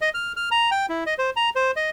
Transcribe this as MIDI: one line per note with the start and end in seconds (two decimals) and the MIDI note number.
0.01 0.09 75
0.14 0.33 89
0.36 0.49 89
0.51 0.70 82
0.71 0.86 79
0.89 1.04 64
1.07 1.14 75
1.18 1.30 72
1.36 1.50 82
1.55 1.71 72
1.76 1.90 75